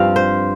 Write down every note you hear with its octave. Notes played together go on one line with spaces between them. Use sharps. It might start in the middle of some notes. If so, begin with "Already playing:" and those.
Already playing: G2 F3 C4 F5
C5